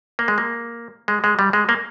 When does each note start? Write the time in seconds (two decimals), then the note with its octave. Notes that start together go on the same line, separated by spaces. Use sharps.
0.19 A#3
0.28 G#3
0.38 A#3
1.08 G#3
1.24 G#3
1.39 G3
1.53 G#3
1.69 A#3